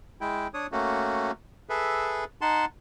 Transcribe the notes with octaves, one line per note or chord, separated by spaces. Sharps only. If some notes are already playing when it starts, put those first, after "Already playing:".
G#3 E4 G5
D4 C#5 D#6
A3 A#3 C#4 F#4
G#4 A4 B4 E5
D#4 F#5 A5 C6